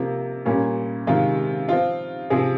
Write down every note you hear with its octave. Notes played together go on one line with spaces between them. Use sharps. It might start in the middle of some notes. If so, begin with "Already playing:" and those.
Already playing: C3 F3 A#3
A#2 G3 A#3 C#4
C3 D#3 G#3 F4
F3 C4 F4
C3 F3 C4 G#4